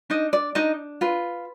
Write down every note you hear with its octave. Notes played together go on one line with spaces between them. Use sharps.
D4 D#4 D#5
D5
D4 D#4 D#5
F4 B4